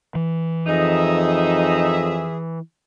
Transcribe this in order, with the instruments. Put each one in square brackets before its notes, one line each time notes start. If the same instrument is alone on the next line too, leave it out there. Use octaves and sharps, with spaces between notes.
[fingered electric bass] E3
[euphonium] F2 [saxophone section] D#4 [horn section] G#4 E5